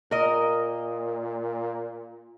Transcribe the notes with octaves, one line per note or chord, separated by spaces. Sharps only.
A#2 A#4 D#5